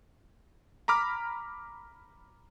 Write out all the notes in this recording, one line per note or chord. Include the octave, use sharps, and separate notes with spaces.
A#5 B5 D6 F6